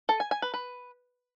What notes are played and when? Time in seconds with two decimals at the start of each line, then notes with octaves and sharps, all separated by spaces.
0.09 A4
0.20 G#5
0.31 G#5
0.42 B4
0.54 B4